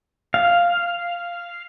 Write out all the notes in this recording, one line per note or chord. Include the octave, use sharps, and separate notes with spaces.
F5